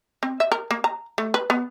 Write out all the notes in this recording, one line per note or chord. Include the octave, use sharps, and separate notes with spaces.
C4
E5
A#4
A#3
A#5
A3
B4
B3